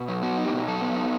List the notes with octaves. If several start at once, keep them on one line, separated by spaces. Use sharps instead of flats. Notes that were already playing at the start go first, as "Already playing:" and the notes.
Already playing: B2
F#3
B3 F#4
D#4
G4
B2
F#3 A4
B3
D#4